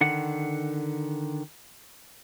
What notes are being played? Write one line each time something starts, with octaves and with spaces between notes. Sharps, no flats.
D3 D#3 F#5